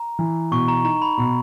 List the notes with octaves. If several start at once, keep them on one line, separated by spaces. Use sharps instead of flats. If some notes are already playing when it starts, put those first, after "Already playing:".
Already playing: A#5
E3
B2 C#6
A#5
D#4 A#5
B5
B2